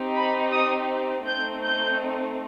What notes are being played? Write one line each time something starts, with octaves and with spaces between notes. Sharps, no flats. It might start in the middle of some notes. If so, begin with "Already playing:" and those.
Already playing: C4 D#4 G4
B5
D#6
A3 C4 D#4 G6
G6